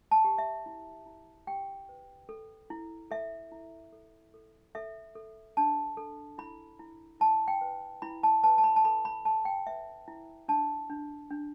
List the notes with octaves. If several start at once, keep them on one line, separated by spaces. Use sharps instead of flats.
A5
G4
E5
E4
E4
G4 G5
B4
A4
E4
A4 E5
E4
A4
A4
A4 E5
A4
D4 A5
A4
E4 B5
E4
E4 A5
G5
B4
E4 B5
A5
B4 A5
A5
B5
A5
A4 B5
B5
A4 A5
G5
B4 E5
E4
D4 A5
D4
D4